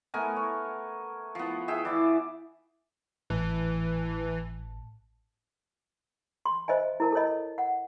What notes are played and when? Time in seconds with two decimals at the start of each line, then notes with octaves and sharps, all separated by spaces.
0.14 A3 B3 A#4 G#5
0.36 C#5
1.35 F3 B3
1.68 G#4 E5 G5
1.85 E3 D5
3.30 G#1 A2 E3 A5
6.46 C6
6.68 C5 D#5 E5 G#5
7.00 E4 A#4 A5
7.12 A4 A#4 C#5 D#5
7.58 F#5